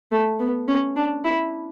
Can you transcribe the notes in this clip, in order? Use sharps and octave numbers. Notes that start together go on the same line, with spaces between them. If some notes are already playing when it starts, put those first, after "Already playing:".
A3
B3
C#4
D4
E4